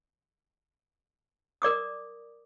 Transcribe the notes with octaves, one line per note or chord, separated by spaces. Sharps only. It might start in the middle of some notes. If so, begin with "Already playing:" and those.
A#4 D5 D6 D#6